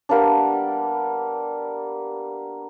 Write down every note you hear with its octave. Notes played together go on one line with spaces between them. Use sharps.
G3 A#3 B3 D4